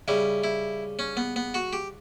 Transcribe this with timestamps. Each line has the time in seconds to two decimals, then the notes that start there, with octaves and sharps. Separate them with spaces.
0.08 C#3 G3 E4
0.44 E4
0.99 C#4
1.17 B3
1.36 B3
1.54 F#4
1.73 G4